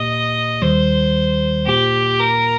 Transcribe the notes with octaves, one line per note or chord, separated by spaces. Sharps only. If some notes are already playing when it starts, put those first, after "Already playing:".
Already playing: A#2 A#3 G4 D#5
D#2 D#3 G3 C5
A#2 A#3 F4 G4
A#4